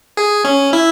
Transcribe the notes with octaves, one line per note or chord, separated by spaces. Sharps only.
G#4
C#4
E4